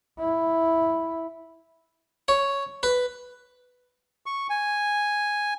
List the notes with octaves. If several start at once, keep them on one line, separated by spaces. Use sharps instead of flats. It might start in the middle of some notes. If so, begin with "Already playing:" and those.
E4
C#5
B4
C#6
G#5